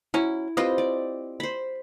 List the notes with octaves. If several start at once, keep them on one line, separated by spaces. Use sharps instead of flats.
F#3 C#4 E4
C4 F4 G4 B4 D#5
D5
C5 B5